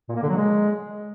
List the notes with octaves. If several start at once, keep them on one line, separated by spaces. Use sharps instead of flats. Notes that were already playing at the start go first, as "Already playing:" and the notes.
A#2
A#3
D3
F#3
G#3